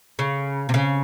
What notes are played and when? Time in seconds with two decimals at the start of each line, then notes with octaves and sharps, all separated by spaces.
0.19 C#3
0.69 C3
0.74 C#3